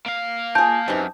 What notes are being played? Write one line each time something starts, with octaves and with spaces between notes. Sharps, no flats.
A#3 F5
F4 G#4 A5 G6
F#2 C3 E3 D#4